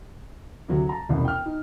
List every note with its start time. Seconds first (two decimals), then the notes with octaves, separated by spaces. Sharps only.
0.68 D2 C3 F#3
0.89 A5 A#5
1.09 E1 C2 F#2
1.25 G5 F6
1.46 D#4